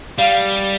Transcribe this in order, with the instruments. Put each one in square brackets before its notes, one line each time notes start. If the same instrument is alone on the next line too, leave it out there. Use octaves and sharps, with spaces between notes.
[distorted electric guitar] G3 [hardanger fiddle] F5